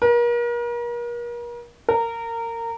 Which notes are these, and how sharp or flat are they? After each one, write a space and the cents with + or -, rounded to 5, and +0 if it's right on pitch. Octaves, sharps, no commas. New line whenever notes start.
A#4 +40
A#4 -20